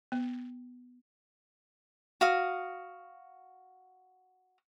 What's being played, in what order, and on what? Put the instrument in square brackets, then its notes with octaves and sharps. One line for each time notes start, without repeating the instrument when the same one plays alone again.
[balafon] B3
[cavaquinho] F#4 F5 D#6